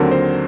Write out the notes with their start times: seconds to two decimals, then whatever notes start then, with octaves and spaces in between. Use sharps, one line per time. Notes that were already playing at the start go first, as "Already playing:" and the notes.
Already playing: D#2 D3 F#3 C4 A#4
0.11 C5